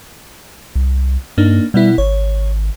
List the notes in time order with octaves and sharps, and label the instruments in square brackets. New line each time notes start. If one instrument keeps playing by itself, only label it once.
[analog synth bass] C2
[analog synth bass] G2 [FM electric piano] A#3 D4 D#4
[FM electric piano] B2 B3 E4 [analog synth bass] G3
[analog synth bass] G#1 [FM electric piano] C#5